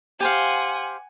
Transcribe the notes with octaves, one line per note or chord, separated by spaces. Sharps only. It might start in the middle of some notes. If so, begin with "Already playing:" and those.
G4 C5 F5 F#5 G#5